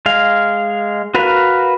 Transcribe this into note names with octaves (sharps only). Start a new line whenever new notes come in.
G#3 F5
F#4 A#4 B4 F5